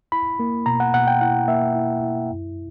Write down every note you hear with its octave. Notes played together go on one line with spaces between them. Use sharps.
E4 B5
A#3
B2 A#5
F#5
B2 F#5
G5
E4 F#5
A#3 E5
E4
E4
F#2